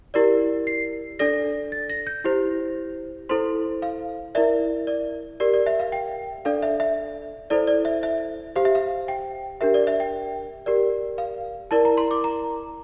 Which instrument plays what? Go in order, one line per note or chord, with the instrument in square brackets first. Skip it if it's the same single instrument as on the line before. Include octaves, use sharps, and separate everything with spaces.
[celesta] E4 G4 A#4 D5
C7
D4 A4 D5 A#6
A6
A#6
G6
E4 G4 C5
E4 A4 C5 C6
F5
E4 A#4 D5 E5
D5
G4 A#4 D5
D5
E5
F5
G5
D4 A4 D5 F5
E5
E5
E4 A4 C5 D5
D5
E5
E5
G4 C5 F5
E5
F5
G5
D4 G4 A#4 E5
D5
E5
G5
G4 A#4 D5
F5
E4 A#4 D5 A5
A#5
C6
D6
A#5